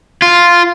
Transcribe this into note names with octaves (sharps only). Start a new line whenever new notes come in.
F4